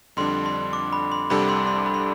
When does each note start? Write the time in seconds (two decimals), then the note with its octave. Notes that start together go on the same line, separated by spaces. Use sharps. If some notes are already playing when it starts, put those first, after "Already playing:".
0.17 F2 D3 G3 D4 C6
0.46 C6
0.73 D6
0.93 B5
1.12 C6
1.30 C2 C3 G3 D4 A4 B5
1.49 C6
1.67 C6
1.86 B5
1.94 C6